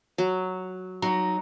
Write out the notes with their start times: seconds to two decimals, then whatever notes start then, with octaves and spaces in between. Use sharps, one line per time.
0.18 F#3
1.02 F#3 D#4 A#5